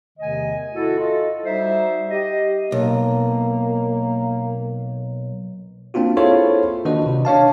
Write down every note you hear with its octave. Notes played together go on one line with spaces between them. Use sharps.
E2 C3 D#3 A3 D#5 G#5
E4 F#4 A4
F4 A4 D#5
G3 D#4 F#4 C5 E5
G4 D#5
B1 A#3
A#3 C4 D4 F4 F#4
E4 F4 G#4 A4 C5 C#5
D#3 A#3 D4 F#4 B4 D#5
C3
D4 C#5 F5 A5